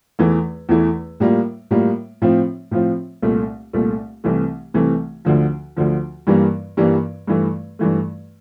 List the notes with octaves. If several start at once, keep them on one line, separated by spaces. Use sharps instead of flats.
E2 E3 A3 E4
E2 E3 A3 E4
A2 G3 A#3 F4
A2 G3 A#3 F4
A2 F3 C4 F4
A2 F3 C4 F4
C2 A#2 A3
C2 A#2 A3
C2 C3 E3 A3
C2 C3 E3 A3
D2 D3 F3
D2 D3 F3
G2 E3 G3 A#3
G2 E3 G3 A#3
G2 E3 A3
G2 E3 A3